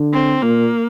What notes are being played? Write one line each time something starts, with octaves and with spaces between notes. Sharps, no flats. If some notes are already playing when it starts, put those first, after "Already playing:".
Already playing: D3
C4
A#2 A#3